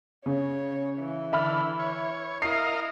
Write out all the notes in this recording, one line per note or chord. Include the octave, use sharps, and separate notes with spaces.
C#3 C#5
E3
D3 E5 B5 F6
C#5
E4 A#4 D#5 F5 C7